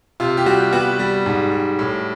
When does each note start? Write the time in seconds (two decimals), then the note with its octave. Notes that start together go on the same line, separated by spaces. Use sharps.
0.20 C3 F4
0.37 G4
0.46 G3 F#4
0.72 B3 F#4
0.99 G3
1.26 G#2
1.52 G3
1.79 A2